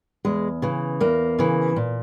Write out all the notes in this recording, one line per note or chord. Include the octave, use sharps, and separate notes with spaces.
E2 G#3
C#3 E3
E2 A#3
C#3 E3
A#2